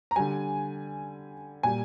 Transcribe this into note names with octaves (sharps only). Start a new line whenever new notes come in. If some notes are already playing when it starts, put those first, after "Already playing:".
A#5
D3 G3 G#5
A#2 G3 G#5